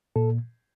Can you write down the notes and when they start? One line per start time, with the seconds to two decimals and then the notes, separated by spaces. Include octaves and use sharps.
0.16 A#2 A4